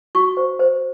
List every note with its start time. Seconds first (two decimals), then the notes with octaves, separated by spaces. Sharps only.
0.15 F#4 C#6
0.37 C5
0.59 C5